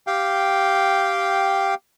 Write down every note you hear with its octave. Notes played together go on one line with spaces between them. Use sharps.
G4 F5 G5